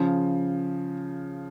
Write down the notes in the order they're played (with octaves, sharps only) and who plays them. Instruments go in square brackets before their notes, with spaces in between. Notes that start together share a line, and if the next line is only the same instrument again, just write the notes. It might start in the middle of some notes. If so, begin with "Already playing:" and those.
Already playing: [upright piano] C#3 F3